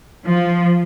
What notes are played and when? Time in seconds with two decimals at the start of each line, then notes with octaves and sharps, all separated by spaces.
0.25 F3